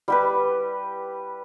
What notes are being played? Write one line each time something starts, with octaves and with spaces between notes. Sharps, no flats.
G3 G4 B4